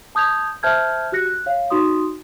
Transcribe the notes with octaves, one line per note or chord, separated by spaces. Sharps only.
A5 D#6 G6 G#6 F7
C5 E5 A5 F6 G6 G#6
F#4 G4 F#6 A#6 C#7
F#6
C#5 F5
D#4 F#4 C6 D#6